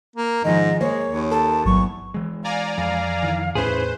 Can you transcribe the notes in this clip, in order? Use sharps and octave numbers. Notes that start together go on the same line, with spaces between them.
A#3
G#2 D#3 F3 D#5
G#3 A#3 C5 C#5 A#6
D#2
A4 A5
A1 E2 G#2 F#3 C#6
E3 G#3
D5 F5 G#5 A#5
F2 F5
D#3 E3
E2 A2 C#4 E4 G#4 B4 C5